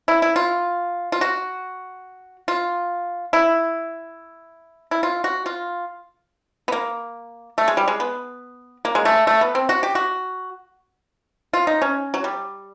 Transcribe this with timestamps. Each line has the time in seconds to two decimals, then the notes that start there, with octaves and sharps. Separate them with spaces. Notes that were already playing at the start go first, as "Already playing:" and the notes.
0.08 E4
0.22 E4
0.36 F4
1.12 F4
1.21 F#4
2.48 F4
3.33 E4
4.91 E4
5.03 F4
5.24 F#4
5.46 F4
6.68 B3
6.72 A#3
7.58 A3
7.68 G#3
7.77 G3
7.88 G#3
8.00 B3
8.85 A#3
8.95 G#3
9.05 A3
9.27 A3
9.41 B3
9.55 C4
9.69 F#4
9.83 G4
9.95 F#4
11.53 F4
11.67 D#4
11.82 C#4
12.14 F#3
12.24 G3